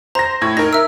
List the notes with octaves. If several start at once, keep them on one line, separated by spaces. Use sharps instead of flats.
C5 A#5 A#6
A2 G#6
D#4 A#4 A#6
E5 E6